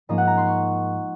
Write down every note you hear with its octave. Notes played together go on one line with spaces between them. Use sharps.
G#2 F3 A#3 C#4 D#5
F#5
A#5
C6
C#6